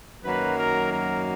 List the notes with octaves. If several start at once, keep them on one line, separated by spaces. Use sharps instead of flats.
F#2 D#3 F#3 A#3 B4
A#4
A#4